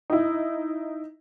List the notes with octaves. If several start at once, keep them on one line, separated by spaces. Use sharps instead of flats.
D#4 E4